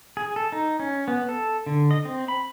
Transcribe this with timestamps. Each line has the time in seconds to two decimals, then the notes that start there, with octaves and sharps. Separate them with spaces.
0.17 G#4
0.36 A4
0.52 D#4
0.79 C#4
1.08 B3
1.29 A4
1.66 D3
1.91 D#5
2.05 C4
2.28 B5